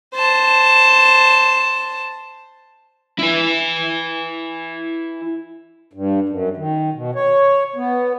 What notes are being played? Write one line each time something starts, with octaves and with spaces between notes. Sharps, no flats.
C5 A5
E4 B4
G2
F#2
D#3
B2
C#5
B3